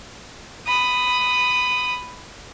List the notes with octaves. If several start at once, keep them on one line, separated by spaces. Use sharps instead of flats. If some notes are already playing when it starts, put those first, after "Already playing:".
B5 D#6